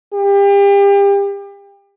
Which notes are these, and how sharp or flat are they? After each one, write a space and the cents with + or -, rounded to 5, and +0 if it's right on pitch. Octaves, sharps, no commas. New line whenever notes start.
G4 +35